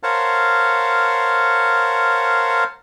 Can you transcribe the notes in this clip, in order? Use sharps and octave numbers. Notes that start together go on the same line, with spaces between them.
A#4 C5 C#5 F5 F#5 A5